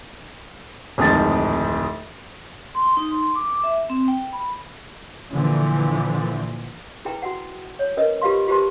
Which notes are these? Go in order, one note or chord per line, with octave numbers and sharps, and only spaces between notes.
D1 F2 G#2 D#3 A6
C6
D#4
C6
D6
E5
C4
G5
B5
A#2 D3 E3 F3
E4 G#4 B4 G5 A#5
F#4 F#5
C#5
C#4 A#4 B4 D#5
F4 G4 B4 F5 C6
F4 G4 B4 C5 A5 C6